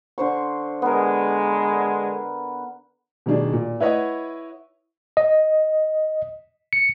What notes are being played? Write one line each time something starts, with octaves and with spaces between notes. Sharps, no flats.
D3 C5 C#6
D3 G#3 B3 A#4
B2 D#3 G3 D4 G#4
A#2
E4 B4 C#5 D#5 F#5
D#5
C#7